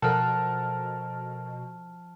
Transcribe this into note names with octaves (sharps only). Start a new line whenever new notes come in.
B2 F3 A4 A#4 F#5 A5 F6